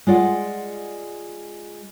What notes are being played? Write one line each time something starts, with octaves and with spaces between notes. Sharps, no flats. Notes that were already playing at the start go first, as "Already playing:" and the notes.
G#3 F4 D5 F#5